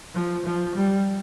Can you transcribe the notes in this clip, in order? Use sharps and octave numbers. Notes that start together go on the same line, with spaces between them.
F3
F3
G3